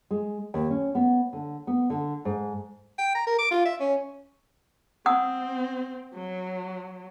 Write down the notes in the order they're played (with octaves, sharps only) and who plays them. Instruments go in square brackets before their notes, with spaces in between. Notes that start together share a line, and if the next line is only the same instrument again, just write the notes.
[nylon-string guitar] G#3
D#2
C#4
B3
D3
B3
D3
G#2
[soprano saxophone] G5
A#5
A#4
D6
F4
E5
C#4
[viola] C4 [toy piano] F#5 D#6 E6
[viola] F#3